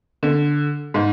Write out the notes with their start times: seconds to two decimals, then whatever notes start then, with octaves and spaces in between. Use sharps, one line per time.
0.23 D3
0.94 G#2